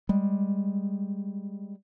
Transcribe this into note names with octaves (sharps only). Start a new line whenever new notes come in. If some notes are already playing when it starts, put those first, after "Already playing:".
G3 G#3